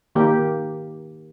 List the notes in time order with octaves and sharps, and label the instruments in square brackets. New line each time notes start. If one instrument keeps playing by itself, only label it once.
[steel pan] D#3 A#3 G4